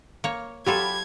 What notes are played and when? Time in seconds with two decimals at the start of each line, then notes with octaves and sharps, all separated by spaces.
0.24 A#3 C#5
0.66 F#3 F4 G4 A4 B5 G#6